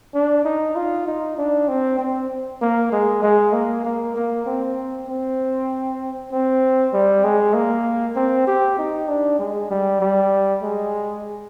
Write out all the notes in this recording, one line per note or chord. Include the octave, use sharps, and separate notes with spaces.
D4
D#4
F4
D#4
D4
C4
C4
A#3
G#3
G#3
A#3
A#3
A#3
C4
C4
C4
G3
G#3
A#3
C4
G4
D#4
D4
G#3
G3
G3
G#3